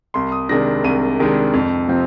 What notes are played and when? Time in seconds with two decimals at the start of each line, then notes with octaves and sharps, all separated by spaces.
0.14 C2 C6
0.32 D#6
0.49 C3 D#3 G#3 D4 A#6
0.84 C2 D#7
1.19 C3 D#3 G#3 D4
1.54 F2
1.88 C3 F3 C4